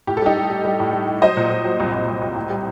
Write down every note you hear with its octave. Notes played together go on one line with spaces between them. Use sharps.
A2 G4
A4
G3 D#4 G4
G3
G3
G3
A2
G3
G3
F#3 C5 D#5
A#2
A#2
F#3
C2
C2
C2
C2
A2
G3